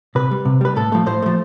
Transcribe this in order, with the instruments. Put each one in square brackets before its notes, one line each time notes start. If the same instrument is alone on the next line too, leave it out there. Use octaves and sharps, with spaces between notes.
[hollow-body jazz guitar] C3 B4
G3
C3
G3 B4
A2 A4
F3 A3
A2 C5
F3 A3